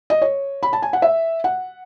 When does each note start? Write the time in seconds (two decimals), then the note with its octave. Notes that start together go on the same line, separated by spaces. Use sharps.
0.10 D#5
0.22 C#5
0.63 B5
0.73 A5
0.82 G#5
0.93 F#5
1.02 E5
1.44 F#5